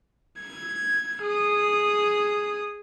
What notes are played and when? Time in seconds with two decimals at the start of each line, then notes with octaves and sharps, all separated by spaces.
0.39 G#6
1.22 G#4 D#6